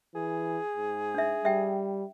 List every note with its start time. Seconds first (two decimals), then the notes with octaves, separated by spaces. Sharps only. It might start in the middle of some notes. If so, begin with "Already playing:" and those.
0.15 E3 G#4
0.77 G#2
1.14 D4 E5
1.45 G3 E5 G5